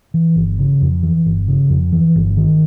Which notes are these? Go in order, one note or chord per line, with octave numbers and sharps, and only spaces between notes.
E3
G1
C#3
F2
E3
G1
C#3
F2
E3
G1
D#3